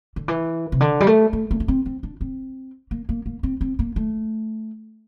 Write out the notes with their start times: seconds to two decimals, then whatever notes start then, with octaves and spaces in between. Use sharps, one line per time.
0.16 D3
0.28 E3
0.72 C3
0.81 D3
1.00 G3
1.07 A3
1.33 A3
1.51 A#3
1.60 D4
1.68 C4
1.86 C4
2.03 D4
2.21 C4
2.91 A#3
3.09 A#3
3.26 A#3
3.43 C4
3.61 C4
3.79 A#3
3.96 A3